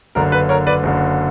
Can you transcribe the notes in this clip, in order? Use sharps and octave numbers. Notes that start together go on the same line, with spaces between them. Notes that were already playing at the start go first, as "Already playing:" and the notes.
F#1 F#2 D3 A#4
B4
A#4 C#5
B4 D5
F#1 F#2 D3